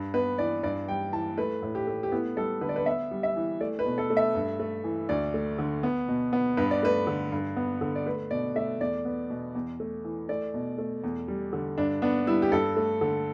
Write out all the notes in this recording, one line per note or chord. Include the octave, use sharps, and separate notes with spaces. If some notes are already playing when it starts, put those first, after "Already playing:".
Already playing: G2
B3 B4
E3 D5
G2 D5
G3 G5
E3 A5
A3 B4
A2
G4
A3
G4
B3 E4
G3 A4
D3 B4
D5
B4
B3 E5
G3
E5
E3
A3 D5
B4
B2
A4
A3
E5
G2
A3
E3
D2 D5
A3
D3
B3
B2
B3
G2 B4
D5
A3 B4
D3
G2
B3
D3
D5
A3 B4
B2 D5
A3 E5
E2 D5
B3
B2
E2
A3
E3
A3 D5
B2
A3
E2
G3
D3
G2 D4
B3 D4
G3 E4
G4
G2 A4
A3
D3